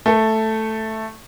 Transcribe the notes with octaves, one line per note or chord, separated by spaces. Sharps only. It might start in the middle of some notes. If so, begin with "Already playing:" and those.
A3 A4